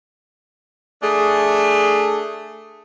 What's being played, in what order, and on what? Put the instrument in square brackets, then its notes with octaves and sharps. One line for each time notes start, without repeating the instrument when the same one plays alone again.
[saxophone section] A3 D4 G#4